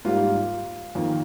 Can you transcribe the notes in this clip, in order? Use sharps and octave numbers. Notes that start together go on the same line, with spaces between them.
G#2 G3 A#3 F4
F2 D#3 A#3